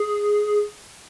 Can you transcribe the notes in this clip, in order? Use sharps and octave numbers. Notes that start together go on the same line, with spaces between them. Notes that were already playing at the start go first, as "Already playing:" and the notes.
Already playing: G#4